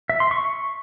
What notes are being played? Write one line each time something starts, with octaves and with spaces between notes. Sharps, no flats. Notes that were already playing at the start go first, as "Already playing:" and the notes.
E5
C6
C#6